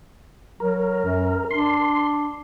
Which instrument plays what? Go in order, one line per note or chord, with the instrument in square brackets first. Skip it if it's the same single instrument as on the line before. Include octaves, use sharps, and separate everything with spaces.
[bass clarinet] F#3 [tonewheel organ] A#4
[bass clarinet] F#2
[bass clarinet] D4 [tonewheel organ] C6